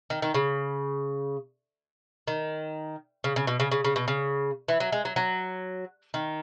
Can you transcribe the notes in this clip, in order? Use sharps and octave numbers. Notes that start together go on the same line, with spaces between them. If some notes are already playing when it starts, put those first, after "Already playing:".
D#3
D#3
C#3
D#3
C#3
C#3
B2
C#3
C#3
C#3
B2
C#3
E3
F#3
G#3
F#3
F#3
D#3